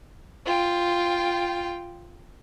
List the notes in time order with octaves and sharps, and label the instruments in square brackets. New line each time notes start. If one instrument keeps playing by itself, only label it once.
[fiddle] F4 G5